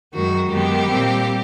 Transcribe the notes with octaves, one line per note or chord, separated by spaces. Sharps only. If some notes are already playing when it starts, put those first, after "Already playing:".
F#2 D#3 G#3 F#4
F#2 D#3 G#3 B3 G4
A#2 G3 C4